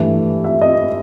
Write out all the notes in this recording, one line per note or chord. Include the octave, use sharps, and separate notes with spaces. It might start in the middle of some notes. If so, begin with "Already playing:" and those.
Already playing: G2 E3 A3
E5
D#5